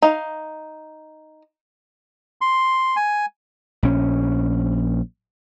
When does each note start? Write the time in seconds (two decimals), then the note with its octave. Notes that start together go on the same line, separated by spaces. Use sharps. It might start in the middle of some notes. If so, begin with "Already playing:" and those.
0.02 D#4 F5
2.41 C6
2.96 G#5
3.83 A#1 C#4